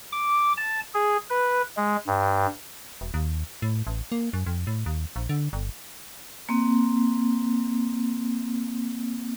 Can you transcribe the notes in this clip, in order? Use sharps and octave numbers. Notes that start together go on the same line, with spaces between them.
D6
A5
G#4
B4
G#3
G2
E1
D#2
A2
A1
A#3
F#2
F2
A2
D#2
A#1
D3
G1
A#3 C4